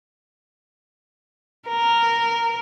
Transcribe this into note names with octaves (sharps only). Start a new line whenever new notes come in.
A#4